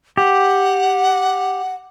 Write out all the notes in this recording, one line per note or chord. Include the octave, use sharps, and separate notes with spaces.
G4 F#5